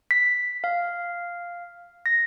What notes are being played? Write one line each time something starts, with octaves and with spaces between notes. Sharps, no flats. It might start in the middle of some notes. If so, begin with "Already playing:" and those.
B6
F5
A#6